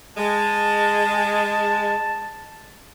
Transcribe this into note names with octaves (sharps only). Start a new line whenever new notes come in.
G#3 A5